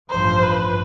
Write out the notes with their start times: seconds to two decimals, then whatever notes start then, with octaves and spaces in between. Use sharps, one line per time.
0.10 A1 G2 F3 C5
0.43 B4